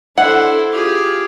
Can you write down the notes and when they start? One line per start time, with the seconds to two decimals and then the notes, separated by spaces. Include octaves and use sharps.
0.18 D4 E4 A4 C5 F#5
0.72 F4 G4 G#4